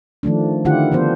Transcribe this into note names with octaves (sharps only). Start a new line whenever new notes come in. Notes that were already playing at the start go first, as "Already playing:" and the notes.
D#3 F3 A3 D4
D3 D#3 E4 F4 G4 F#5
F3 B3 D4 C5